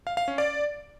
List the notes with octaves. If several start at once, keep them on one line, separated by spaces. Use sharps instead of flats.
F5
F5
C#4
D5